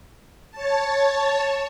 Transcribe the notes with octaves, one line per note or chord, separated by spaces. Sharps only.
C#5 A5